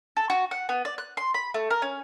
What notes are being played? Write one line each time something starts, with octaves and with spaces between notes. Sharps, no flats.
A4
F#4
F#5
B3
D5
F#6
C6
B5
A3
A#4
C#4